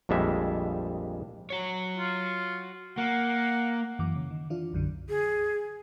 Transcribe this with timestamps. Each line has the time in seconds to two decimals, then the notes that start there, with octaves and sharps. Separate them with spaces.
0.09 A#1 F2 G3 G#3 E5
1.50 F#4 C#5
1.97 F4
2.98 A#3 F#5
3.99 F#2 E3 D6
4.16 C#3
4.31 D#3
4.50 E3 D4 F4
4.73 B1 F#2 D3
5.09 G#4